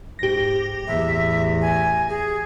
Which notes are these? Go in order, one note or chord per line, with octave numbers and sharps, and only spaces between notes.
G#2 G4 A#6
E2 A2 E5
G#5
G#4